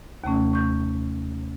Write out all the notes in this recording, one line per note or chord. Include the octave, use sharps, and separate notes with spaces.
D#2 C3 A3 C#4
A3 C#6 G6